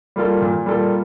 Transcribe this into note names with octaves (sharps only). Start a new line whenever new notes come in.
G3 A#3 F4 A4
A#2
G3 A#3 F4 A4